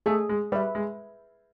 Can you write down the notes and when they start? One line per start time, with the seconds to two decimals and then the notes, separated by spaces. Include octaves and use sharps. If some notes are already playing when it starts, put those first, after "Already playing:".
0.06 A3 G#4
0.29 G#3
0.52 G3 B4 E5
0.75 G#3